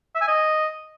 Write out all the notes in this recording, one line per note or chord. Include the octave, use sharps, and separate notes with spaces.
E5
G#5
D#5